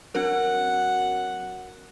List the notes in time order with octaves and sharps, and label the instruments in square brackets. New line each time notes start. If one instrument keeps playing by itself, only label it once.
[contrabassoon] F#3 [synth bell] C4 D4 A#4 [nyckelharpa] F#5